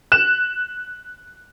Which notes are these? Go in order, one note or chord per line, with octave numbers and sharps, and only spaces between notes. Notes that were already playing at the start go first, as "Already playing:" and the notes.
F#6 E7